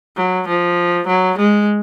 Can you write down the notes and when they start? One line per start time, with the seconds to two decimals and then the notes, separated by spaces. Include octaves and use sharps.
0.17 F#3
0.47 F3
1.07 F#3
1.38 G#3